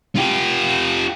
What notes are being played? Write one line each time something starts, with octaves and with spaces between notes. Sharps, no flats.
F4 G4